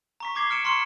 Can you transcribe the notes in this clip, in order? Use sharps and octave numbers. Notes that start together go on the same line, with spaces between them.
A#5 C#6 B6
A#5 D6 G#6 C7 G7
F6 C#7 D7 E7
A#5 C6 C#6 F6 C#7